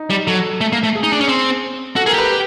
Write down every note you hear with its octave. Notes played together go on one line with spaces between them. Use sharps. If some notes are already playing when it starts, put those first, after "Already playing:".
Already playing: D#4
G3
F#3 A4
A3
A#3
A3
G#4
D#4
D4
C#4
C4
F#4 A4
G#4 A#4
G4 B4